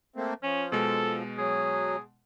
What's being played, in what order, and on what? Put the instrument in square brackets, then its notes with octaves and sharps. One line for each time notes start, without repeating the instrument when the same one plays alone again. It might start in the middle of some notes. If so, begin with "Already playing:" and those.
[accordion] A3 A#3 C4
[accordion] F3 [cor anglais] C#4
[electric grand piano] B2 G#3 [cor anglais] A4
[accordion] F#3 [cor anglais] G#4